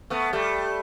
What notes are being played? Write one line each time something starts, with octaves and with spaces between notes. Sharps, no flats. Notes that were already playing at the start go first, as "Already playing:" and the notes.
A3 B3
G3 A3